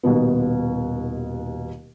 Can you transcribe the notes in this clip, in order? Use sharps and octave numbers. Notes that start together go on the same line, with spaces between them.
D#1 D#2 B2 B3